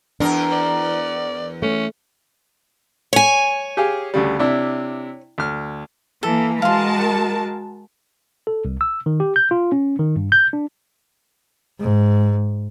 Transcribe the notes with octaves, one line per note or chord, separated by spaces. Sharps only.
E2 D4 A#4
D5
A3 C#4
C#5 G#5
G4 G#4 F5
D2 C#3 G3
C3 D4 E4
D2 F6
E3 A#3 A4
G#3 F#4 A#4 F5 A5 C6
A4
C2
E6
D#3
G4
G6
F4
C#4
D#3
G2
G6
D4
G#2